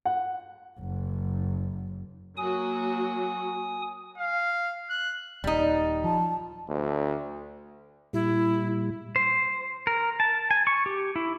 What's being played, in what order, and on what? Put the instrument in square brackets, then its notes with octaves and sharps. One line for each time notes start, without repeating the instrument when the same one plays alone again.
[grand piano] F#5
[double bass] F#1 F#2
[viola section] F#3 A#3 F#4 [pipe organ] G#5 D#6
[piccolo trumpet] F5
F#6
[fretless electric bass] D#1 [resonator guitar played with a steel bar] G3 D#4
[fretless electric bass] F3 [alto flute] A5
[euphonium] D2
[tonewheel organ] A#2 G3 [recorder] E4
[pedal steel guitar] C5
A#4
A5
G#5
C#6
G4
E4